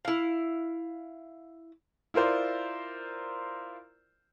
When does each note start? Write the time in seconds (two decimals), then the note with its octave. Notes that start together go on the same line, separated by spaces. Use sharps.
0.05 E4 F5
2.14 E4 F4 A#4 C5 D5